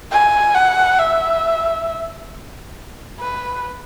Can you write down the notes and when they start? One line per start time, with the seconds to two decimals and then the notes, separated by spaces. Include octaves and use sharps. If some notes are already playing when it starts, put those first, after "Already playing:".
0.11 G#5
0.55 F#5
0.99 E5
3.20 B4